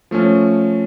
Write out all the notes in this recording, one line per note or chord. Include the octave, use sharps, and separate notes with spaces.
F3 A3 C#4